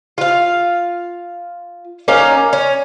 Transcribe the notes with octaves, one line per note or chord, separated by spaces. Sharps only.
F4 F5
A#3 C#4 D#4 F5
C#4